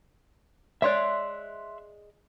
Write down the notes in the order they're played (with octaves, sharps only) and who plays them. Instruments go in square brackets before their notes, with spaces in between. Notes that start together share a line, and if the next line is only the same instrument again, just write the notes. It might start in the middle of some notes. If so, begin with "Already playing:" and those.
[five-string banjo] G#3 C#5 D5 [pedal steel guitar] E5 C6 F#6